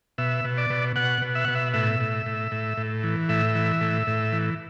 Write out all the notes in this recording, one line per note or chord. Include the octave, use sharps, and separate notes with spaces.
B2 E5
B2
D5
B2
B2 F#5
B2
E5
B2 F#5
E5
A2 E5
A2
A2
A2
A2
E3
A2 E5
E3
A2
A2
E3